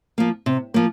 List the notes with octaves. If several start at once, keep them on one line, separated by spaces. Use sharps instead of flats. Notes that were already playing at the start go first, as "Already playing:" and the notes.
F3 A#3
C3
F3 A#3